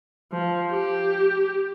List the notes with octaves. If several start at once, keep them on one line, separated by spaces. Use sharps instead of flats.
F3
G4